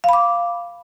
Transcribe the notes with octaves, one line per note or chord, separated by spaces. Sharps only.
F5 B5 D6